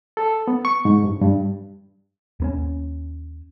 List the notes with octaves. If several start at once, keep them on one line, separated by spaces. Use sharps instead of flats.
A4
B3
C#6
G#2
G2
G2
D#2 B3 C#4